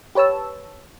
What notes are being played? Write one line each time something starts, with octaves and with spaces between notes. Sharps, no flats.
G4 B4 C#5 A5 E6